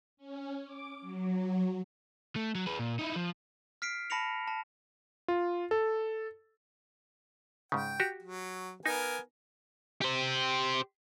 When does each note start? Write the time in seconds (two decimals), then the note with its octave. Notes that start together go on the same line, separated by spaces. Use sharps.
0.17 C#4
0.65 D6
1.01 F#3
2.36 A3
2.55 F#3
2.67 G#4 B4
2.79 A#2
2.99 D#4 E4
3.16 F3
3.82 F6 B6 C7 D7
4.10 A5 B5 A#6 C#7 F7
4.48 A5
5.28 F4
5.71 A4
7.72 G#2 C#3 G5
8.00 F#4 G4
8.23 F#3
8.86 B3 D#4 A#4 G#5
10.01 G4 C5